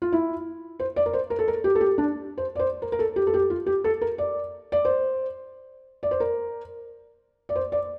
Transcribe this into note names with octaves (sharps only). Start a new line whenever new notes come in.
F4
E4
C5
D5
A#4
C5
A#4
A4
A#4
G4
A4
G4
D4
C5
D5
C5
A#4
A#4
A4
G4
A4
G4
F4
G4
A4
A#4
D5
D5
C5
D5
C5
A#4
D5
C5
D5